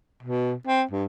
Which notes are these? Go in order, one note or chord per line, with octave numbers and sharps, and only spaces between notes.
B2
C4
G2